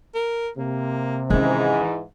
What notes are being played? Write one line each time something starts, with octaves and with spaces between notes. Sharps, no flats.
A#4
C3 A#3
G#2 D#3 E3 G#3 C#4